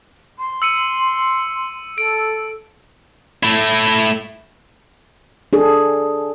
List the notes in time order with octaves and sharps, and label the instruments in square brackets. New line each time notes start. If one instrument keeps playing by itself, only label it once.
[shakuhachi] C6
[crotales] E6 C#7 D#7
[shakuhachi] A4 [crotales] D7
[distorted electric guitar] A3 E4
[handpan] D4 G#4 A4